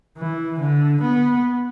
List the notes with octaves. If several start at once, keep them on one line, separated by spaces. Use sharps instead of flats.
E3
D3
B3